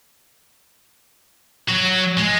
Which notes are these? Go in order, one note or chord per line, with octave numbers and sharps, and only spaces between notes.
F#3
G#3